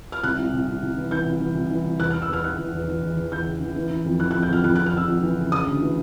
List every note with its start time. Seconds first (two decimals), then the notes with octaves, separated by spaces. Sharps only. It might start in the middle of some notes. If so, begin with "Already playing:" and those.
0.12 F6
0.23 C2 F#6
0.38 C2
0.53 C2
0.67 C2
0.82 C2
0.97 E3
1.11 E3 G6
1.26 C2
1.41 E3
1.55 C2
1.70 E3
1.85 C2
1.99 E2 F#6
2.10 E3 F6
2.22 E6
2.29 E2 F6
2.44 E3 F#6
2.58 E2
2.73 E2
2.88 E3
3.02 E2
3.17 E2
3.32 E2 G6
3.46 C#3
3.61 E3
3.76 E3
3.91 E3
4.05 F2
4.20 E3 F#6
4.31 F2 F#6
4.42 G6
4.49 F2 F6
4.64 F2 F#6
4.75 F2 F#6
4.86 F6
4.93 F2 E6
5.08 F2
5.22 E3
5.38 C#3
5.52 C#3 D#6
5.66 D2
5.81 E3